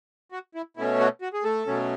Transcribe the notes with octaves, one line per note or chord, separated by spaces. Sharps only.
F#4
E4
B2 A3 C#4 E4
F#4
F#4
G#4
A3 A4
B2 F#3 A3 C#4